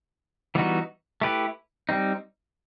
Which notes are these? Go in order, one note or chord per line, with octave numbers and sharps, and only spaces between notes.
E3 G3 B3 D#4 F#4
A3 E4 G4 B4
G3 C4 D#4